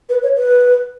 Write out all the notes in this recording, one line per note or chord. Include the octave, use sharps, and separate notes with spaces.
B4
C#5
B4